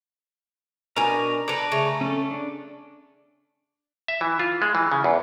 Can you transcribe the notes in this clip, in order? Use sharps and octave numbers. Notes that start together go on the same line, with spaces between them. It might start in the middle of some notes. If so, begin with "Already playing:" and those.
B2 D4 A#4 G#5 A#5
A4 B4 D5 A#5
C#3 A3
C#4 A4
D4
E5
E3
F4
G#3
E3
C#3
E2